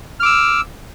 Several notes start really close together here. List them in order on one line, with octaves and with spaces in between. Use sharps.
F6 D6 E6